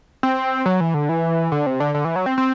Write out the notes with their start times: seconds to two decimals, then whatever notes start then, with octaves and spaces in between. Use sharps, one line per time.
0.23 C4
0.66 F#3
0.81 E3
0.94 D3
1.09 E3
1.52 D3
1.66 C3
1.80 D3
1.95 D3
2.05 E3
2.16 F#3
2.26 C4
2.38 C4